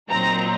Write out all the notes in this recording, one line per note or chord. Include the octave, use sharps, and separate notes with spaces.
A#2 F#3 C4 D#4 A#5